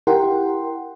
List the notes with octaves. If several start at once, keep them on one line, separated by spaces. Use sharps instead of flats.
E4 G4 A#4 F#5 G5 C6